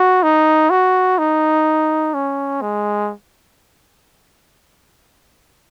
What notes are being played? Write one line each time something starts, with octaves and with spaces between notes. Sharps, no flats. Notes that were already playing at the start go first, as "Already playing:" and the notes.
Already playing: F#4
D#4
F#4
D#4
C#4
G#3